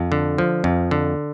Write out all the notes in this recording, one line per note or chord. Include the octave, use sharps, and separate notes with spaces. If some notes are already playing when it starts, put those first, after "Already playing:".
Already playing: F2
D3
F3
F2
D3